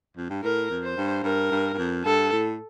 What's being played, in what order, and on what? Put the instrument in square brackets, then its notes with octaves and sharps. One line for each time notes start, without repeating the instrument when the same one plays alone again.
[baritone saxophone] F2
G2
[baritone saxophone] A2 [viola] A#4
[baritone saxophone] F2
[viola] C5
[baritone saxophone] G2
[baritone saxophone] G2 [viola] A#4
[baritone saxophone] G2
G2
F2
[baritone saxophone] G2 [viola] A4
[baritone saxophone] A2